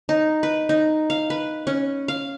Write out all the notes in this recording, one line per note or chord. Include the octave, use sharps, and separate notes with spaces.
D#4
B4
D#4
F5
B4
C#4
F5